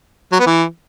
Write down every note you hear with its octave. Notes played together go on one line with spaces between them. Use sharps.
F#3
B3
E3